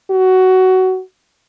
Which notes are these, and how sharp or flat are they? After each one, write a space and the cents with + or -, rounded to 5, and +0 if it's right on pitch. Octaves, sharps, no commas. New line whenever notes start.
F#4 +15